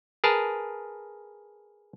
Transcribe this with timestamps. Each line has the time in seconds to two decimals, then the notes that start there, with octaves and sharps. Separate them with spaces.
0.24 G#4 A#4 B4 A5